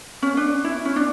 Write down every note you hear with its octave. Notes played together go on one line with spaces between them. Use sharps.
C#4
D4
E4
C#4
D4